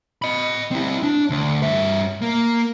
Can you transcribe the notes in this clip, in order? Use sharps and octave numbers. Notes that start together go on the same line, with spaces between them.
D#5 B5
C4 E4
D4
D2
G2 E5
A#3